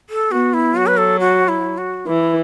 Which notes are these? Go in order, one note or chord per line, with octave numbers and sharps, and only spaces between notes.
A4
B3 F#4
E4
F#3 F#4
B4
A4
F#4
E4
F#4
E3 E4